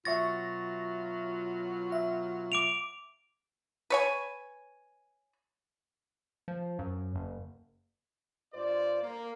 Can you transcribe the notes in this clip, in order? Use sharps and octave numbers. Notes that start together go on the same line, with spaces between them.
B2 F#3 F4 E5 C#6 A6 A#6
E5
D6 D7 F7
B4 C#5 G#5
F3
F#2
F#1
G2 F4 C5 D5
A#3